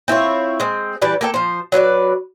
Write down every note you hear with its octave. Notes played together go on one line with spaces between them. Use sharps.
C4 E4 F4 C#5
G#3 C4
E3 G3 B4 D5
A#3 A4 G5
F3 C5
F#3 B4 C#5 D5